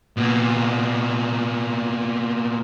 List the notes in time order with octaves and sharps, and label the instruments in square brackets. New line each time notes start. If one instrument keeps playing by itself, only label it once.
[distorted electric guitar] A#2 B3